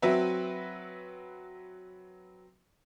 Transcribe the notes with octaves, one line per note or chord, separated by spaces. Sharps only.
F#3 C4 F#4 B4 E5